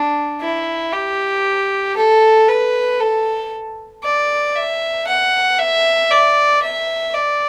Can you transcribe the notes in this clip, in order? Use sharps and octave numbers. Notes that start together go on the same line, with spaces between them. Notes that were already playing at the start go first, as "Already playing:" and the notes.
Already playing: D4
E4
G4
A4
B4
A4
D5
E5
F#5
E5
D5
E5
D5